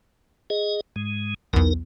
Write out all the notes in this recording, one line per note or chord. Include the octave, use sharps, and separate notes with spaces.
G#4 D#5
G#2 G#3
B1 E2 D#4 A#4